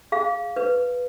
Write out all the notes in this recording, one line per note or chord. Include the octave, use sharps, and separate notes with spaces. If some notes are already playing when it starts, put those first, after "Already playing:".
G#4 F5
B4